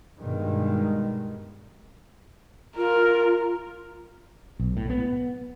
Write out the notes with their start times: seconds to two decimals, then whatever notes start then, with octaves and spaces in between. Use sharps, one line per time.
0.19 G2 B2 D#3 G#3
2.77 F4 A#4
4.60 B1
4.77 A2
4.90 B3